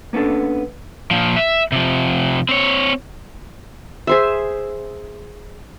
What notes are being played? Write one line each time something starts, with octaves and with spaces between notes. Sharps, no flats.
A#3 B3 C#4 D4 A4
A#2 F3
E5
C3 F3
C4 C#5
G#4 C5 E5